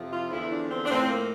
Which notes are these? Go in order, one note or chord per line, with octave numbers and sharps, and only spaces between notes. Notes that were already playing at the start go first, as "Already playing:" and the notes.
Already playing: F2 C3 F3
F4
E2 D3 F3 E4
D4
C4
D4
A2 F3 C4
A#3